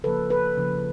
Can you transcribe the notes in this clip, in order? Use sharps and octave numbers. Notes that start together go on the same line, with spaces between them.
C#3 F3 A#3 A4 B4
A4 B4
C#3 F3 A#3